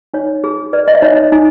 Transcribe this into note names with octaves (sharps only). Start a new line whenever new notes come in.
D#4 C#5
G#4
B4 D5
C#5 D#5
E5
D#4 C#5 D#5
D#4